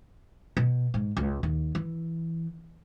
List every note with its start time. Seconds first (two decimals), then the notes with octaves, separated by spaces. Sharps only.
0.57 B2
0.94 G#2
1.17 C#2
1.43 D#2
1.75 E3